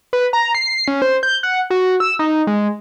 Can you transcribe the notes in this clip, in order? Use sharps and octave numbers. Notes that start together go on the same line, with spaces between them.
B4
A#5
C7
C#4
C5
G6
F#5
F#4
E6
D#4
G#3